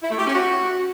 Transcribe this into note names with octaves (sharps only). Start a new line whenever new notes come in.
E4
A3
G4
C#4
F#4